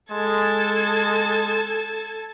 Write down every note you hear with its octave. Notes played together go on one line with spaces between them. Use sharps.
G#3 A4 A5 G#6